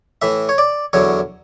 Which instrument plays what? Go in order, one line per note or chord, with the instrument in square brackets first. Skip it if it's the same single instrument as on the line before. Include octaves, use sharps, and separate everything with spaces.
[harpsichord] A2 E3 E5
C#5
D5
E2 D3 F#3 C#5